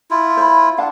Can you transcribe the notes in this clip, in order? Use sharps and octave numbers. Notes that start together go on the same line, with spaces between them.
E4 F4
C5 B5
D4 F5 F#5